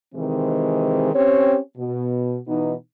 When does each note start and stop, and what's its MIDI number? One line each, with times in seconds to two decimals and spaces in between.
0.15 1.13 48
0.15 1.13 51
0.15 1.13 52
0.15 1.13 56
0.15 1.13 60
1.14 1.58 60
1.14 1.58 61
1.14 1.58 67
1.14 1.58 73
1.78 2.39 47
2.48 2.74 47
2.48 2.74 52
2.48 2.74 59
2.48 2.74 63